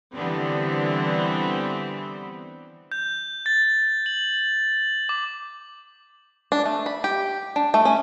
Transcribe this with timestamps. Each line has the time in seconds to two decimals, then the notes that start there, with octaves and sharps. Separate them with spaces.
0.15 D3 E3 G3 B3 C4
2.92 G6
3.46 A6
4.06 F#7
5.09 D6
6.52 D4
6.65 A3
6.86 B5
7.04 G4
7.56 D4
7.74 A3
7.85 C#4